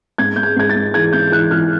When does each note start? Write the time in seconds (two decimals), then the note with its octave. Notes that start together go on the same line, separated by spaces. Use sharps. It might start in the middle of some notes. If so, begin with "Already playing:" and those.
0.18 G#2 G#6
0.36 G#2 G6
0.43 G#6
0.56 G#2 G#6
0.70 A6
0.76 G#2
0.94 E3 G#6
1.13 G#2 G6
1.32 E3 F#6
1.51 E3 F6